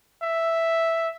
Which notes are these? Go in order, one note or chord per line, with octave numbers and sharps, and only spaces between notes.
E5